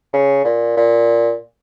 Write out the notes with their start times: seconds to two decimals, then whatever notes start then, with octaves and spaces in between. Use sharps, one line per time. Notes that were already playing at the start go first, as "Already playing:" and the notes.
0.13 C#3
0.44 A#2
0.76 A#2